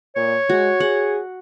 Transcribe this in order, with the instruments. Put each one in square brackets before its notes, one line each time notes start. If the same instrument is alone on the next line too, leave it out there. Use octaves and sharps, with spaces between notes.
[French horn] A#2 [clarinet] C#5
[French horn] G#3 [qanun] F#4
[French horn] G#4 [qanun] F#5